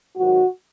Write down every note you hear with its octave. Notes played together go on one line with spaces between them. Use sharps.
G#2 D#3 F#3 F#4